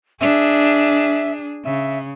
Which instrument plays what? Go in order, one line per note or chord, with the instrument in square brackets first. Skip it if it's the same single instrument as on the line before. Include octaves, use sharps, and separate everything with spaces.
[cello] D4 G#4 [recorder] E5
[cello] C#3 [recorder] E5